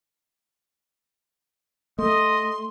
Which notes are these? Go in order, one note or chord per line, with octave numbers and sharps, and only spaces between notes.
A3 D#5 C6